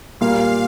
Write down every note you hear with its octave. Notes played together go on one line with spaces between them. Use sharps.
A#2 G3 A#3 F5